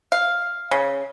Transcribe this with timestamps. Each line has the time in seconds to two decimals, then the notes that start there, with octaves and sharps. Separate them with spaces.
0.12 F5
0.71 C#3